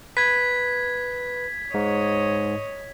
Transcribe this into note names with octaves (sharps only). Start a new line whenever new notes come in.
B4 G#6 B6
G#2 C#5 D#5